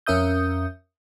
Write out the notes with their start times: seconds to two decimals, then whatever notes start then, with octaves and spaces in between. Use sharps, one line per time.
0.06 F2 C#4 A#4 E5 D#6 G6